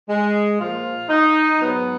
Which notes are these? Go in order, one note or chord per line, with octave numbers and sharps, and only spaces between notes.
G#3
A#2 F3 F4
D#4
G#2 F#3 B3